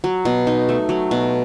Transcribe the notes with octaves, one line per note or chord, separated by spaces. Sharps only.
F#3
B2
D#4
A3
F#3
B2